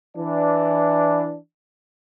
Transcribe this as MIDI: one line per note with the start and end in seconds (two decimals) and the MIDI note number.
0.17 1.36 52
0.17 1.36 62